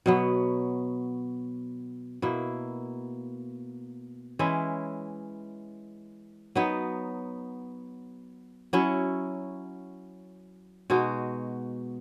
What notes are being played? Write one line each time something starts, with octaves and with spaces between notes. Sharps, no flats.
B2 F#3 B3
B2 A#3 E4
E3 G#3 C#4 E4
F#3 B3 D#4
F#3 C#4 E4
B2 G#3 D#4 F#4